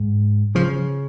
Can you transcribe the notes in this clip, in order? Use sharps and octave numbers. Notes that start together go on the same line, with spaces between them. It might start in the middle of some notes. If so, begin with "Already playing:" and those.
Already playing: G#2
C#3 F3